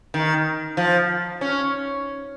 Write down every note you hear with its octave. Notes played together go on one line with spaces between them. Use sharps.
D#3
F3
C#4